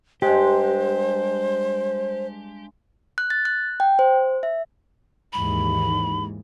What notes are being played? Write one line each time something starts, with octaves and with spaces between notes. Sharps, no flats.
G2 G#3 G4 C5
F#6
A6
F#6
G5
C5
E5
D#2 G#2 E3 B5